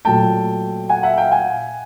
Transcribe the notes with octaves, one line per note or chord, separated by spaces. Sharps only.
A#2 F#3 A3 G5 A5
F#5 G#5
E5 F#5
F5 G5
F#5 G#5